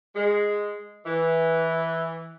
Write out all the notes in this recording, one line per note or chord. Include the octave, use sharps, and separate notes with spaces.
G#3
E3